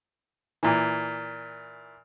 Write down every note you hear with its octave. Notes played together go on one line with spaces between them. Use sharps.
A#2 E3